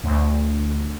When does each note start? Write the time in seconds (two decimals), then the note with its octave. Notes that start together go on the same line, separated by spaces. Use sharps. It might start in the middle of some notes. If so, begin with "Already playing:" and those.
0.04 D2